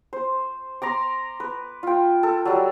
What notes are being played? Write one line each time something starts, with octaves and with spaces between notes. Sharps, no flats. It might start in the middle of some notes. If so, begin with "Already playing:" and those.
C5
A#5 C6 D6
B4
F4 G5
A4
F#3 G3